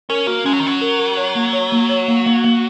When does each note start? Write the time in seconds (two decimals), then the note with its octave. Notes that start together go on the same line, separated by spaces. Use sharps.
0.10 C#4 A#4
0.27 A#3 F#4
0.45 G#3 C#4
0.53 F#3
0.60 D#3
0.63 F#3 C#4
0.81 A#4
0.99 A#4
1.17 C#5
1.35 A#3
1.53 C#5
1.72 A#3
1.89 C#5
2.08 A#3
2.26 A#3
2.44 A#3